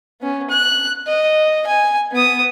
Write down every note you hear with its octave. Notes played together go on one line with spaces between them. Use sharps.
B3 C#4
F#6
D#5
G#5
B3 D#6